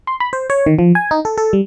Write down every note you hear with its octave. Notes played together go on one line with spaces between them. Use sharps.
C6
B5
C5
C#5
D#3
F3
G#5
D#4
A4
A4
G3